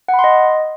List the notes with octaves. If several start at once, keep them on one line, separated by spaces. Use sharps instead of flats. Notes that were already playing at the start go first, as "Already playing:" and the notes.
F#5
B5
C6
D#5